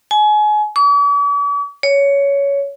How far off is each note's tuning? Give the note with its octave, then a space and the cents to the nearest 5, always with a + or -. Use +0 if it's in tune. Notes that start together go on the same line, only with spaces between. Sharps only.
G#5 +30
D6 -45
C#5 +15